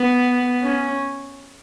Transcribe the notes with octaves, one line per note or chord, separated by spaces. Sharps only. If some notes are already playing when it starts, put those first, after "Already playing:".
Already playing: B3
C#4